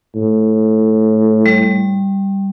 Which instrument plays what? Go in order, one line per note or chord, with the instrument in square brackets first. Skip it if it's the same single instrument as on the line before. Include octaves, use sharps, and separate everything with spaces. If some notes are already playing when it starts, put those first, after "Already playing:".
[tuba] A2
[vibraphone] G3